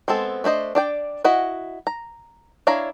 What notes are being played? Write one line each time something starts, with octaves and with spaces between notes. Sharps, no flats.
G#3 B3 C4 A4
A3 D4 C5 D#5
D4 D5 G5
E4 F#4 D#5 F#5
A#5
D4 E4 C#5 F5 A#5